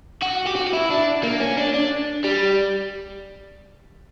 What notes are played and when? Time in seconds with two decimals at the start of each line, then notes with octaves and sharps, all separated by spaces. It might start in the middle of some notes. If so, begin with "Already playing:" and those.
0.23 F#4
0.47 G4
0.56 F#4
0.67 F#4
0.73 E4
0.90 D4
1.23 A#3
1.40 C#4
1.58 D4
1.74 D4
2.24 G3